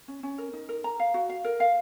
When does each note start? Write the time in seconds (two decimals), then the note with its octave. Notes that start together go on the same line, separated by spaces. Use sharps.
0.08 C#4
0.23 C#4
0.38 A#4
0.53 D#4
0.69 A#4
0.84 A#5
1.00 F5
1.14 F#4
1.29 F5
1.45 A#4
1.60 F5